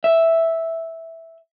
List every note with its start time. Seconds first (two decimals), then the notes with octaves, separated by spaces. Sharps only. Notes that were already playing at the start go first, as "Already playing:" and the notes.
0.04 E5